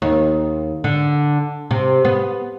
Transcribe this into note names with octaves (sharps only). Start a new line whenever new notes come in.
D#2
D3
C3
B3